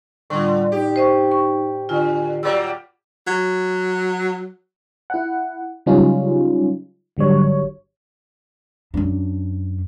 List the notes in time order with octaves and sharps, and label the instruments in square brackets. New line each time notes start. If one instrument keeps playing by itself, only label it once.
[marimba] A2 [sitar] D3 [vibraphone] G3 F4
[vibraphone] D#4 [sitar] G4
[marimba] C5 D#5 C#6
C#6
[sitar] D3 [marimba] F4 [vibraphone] G#5
[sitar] F#3 G3 A#3 [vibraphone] D6 [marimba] E6
[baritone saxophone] F#3
[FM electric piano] E4 F#5
C#3 F#3 G3 C#4 D#4 F4
G#1 D3 F#3 G3 C#5
[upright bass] F#2 D4